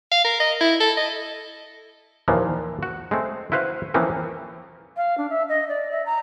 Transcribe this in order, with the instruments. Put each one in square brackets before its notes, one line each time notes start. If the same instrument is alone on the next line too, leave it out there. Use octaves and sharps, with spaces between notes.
[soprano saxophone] F5
A#4
D#5
E4
A4
D#5
[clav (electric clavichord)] D#2 A#2 E3 F3 A#3
F#4
G#3 A3 C4
E4 F#4 B4 C5 F5
E3 F3 A#3 C4 C#4
[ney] F5
D4
E5
D#5
D5
E5
A#5